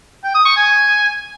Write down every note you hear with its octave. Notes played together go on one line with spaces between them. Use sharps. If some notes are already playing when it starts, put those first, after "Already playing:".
G5
D#6
C#6
G#5